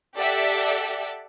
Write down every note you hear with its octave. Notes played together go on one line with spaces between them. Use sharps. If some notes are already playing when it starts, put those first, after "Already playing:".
G4 A4 D5 E5 F#5